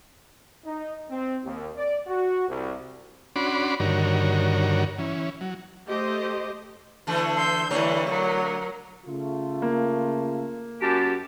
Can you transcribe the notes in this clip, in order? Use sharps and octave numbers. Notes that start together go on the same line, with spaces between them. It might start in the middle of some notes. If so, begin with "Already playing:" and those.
D#4
C4
D#2
D5
F#4
C2
C#4 D4 F#4 B5 C6 D6
G2 D3 D#3 F#4 A#4 C#5
E3 C#4
F#3
A3 G4 C5 D#5
D3 E3 A3
C6 E6 G6
D3 E3 G3 A3 C#5
F#3 A#4
C#3 A3 F4
A#3
F#2 G4 A5